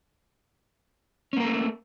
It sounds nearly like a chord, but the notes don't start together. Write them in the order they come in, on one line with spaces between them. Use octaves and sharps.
C#4 A#3 A#4 A3